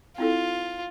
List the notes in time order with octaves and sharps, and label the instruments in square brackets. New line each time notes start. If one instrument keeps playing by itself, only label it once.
[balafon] C4 E4 A4 [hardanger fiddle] F4